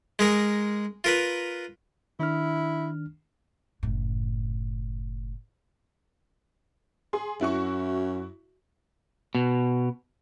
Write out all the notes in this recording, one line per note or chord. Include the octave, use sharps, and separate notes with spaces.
G#3 G#4 A#4
F4 A#4 B4
D#3 D4 E4 F6
F#1 A2
G#4 C6
F#2 E4 F#4 C#6
B2